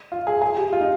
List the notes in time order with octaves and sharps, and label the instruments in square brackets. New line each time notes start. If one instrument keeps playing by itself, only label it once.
[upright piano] F4
G#4
G#4
G4
F4
D#4